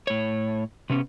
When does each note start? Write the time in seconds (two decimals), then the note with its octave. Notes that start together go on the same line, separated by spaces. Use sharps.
0.07 A2 C#5
0.90 C3 B3 C#4